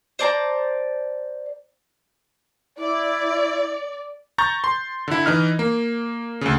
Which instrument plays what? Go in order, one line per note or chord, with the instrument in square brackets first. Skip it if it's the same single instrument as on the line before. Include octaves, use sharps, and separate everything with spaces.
[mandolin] C5 D5 A5 A#5
[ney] E4 [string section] D5
[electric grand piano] A#5 C#6 G6 A6
C6
D3 E4
E3 D#4 F6
A#3
D2 C#3